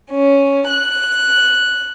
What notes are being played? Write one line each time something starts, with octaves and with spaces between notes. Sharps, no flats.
C#4
F#6